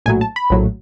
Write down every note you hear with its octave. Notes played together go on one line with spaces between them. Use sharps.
A#1 A2 F#3 G#5
A5
B5
A#1 A2 F#3